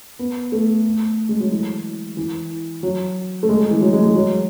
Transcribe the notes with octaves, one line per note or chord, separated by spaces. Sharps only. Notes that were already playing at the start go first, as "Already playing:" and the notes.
B3
A3
G#3
F#3
E3
E3
F#3
A3
G#3
G#3
E3
F#3
G#3
G#3
F#3